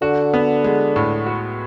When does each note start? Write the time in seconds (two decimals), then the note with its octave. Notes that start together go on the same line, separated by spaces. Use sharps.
0.02 D3 F#4
0.34 B3
0.64 G#3
0.96 A2
1.26 F#4